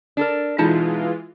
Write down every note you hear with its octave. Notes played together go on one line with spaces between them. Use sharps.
D4 A4 A#4
B2 E3 G#3 D#4 F4 A5